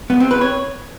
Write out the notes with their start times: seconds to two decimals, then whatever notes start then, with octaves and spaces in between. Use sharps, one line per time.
0.10 B3
0.20 C4
0.31 B4
0.41 C#5